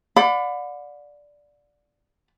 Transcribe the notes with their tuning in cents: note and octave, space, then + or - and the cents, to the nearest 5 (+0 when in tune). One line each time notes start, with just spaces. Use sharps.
D5 +0 F#5 -40 B5 +25